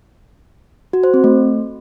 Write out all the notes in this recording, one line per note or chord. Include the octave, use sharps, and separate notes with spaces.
F#4
C5
C4
A3